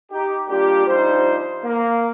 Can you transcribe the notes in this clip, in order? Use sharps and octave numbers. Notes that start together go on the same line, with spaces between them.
D#4 G4
G3 A#3 D4 F4 G4
F3 G3 D4 D#4 C5
A#3